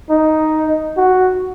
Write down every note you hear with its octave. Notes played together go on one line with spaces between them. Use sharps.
D#4
F#4